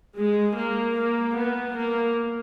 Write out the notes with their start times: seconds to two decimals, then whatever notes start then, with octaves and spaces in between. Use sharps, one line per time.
0.17 G#3
0.57 A#3
0.98 A#3
1.38 B3
1.77 A#3